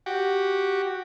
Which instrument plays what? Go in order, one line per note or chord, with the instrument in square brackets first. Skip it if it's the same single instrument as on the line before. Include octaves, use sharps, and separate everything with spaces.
[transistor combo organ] F#4 G4